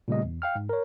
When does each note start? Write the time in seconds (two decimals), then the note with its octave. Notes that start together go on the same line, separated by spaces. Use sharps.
0.08 A#2 C#3 G3 A3 D#5
0.24 E2
0.42 F5 G5 F6
0.55 G#2
0.69 A#4 C#5